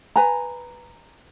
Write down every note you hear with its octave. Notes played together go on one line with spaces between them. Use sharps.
B4 G#5 A#5